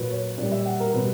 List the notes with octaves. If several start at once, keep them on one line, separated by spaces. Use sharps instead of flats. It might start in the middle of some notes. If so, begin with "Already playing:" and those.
Already playing: A#2 F#3 B4
C#5
A#2 G3 D5
E5
F#5
A#4
B2 G3 B4